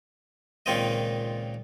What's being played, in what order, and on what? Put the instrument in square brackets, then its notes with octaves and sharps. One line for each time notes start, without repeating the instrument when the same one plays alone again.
[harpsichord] C#2 A#2 D#3 C4 F4 D#5